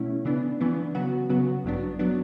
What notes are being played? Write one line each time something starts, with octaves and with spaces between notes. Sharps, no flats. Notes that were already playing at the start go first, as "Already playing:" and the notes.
Already playing: B2 A3 C#4 E4
C#3 E3 B3 D4
C#3 E3 B3 D4
C#3 F#3 B3 F#4
C#3 F#3 B3 F#4
A1 G2 F#3 B3 D4
F#3 B3 D4